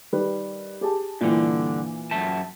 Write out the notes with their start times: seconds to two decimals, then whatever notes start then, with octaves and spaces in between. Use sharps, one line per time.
0.12 D#3 G3 B4
0.81 G4 G#4 A5
1.21 G2 A#2 D3 E3
2.11 F#2 E5 A5